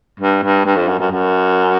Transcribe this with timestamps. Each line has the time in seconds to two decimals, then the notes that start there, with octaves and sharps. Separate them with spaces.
0.20 G2
0.43 G2
0.65 G2
0.76 F2
0.88 F#2
0.99 F#2
1.11 F#2